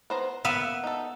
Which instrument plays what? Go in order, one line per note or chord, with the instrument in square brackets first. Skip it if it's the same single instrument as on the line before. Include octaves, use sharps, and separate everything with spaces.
[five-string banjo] B3 C5 A#5
[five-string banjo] A#3 F5 [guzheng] B3 E5
[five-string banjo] D#4 A4